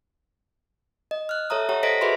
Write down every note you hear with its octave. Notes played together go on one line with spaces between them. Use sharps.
D#5
F6 F#6
A4 C#5 E5 A#5 D#6
G4 C#5 F#5 A#5
A4 C5 D#5 A#6 B6 D7
F#4 G#4 B4 E5 B5 C6